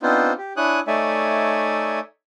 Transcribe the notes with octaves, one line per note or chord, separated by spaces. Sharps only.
B3 C4 D4 D#4 F4 C5
G4
D4 E4 C#5 G#5 D#6 F#6
A3 D#4 C#5 D5 E5 G#5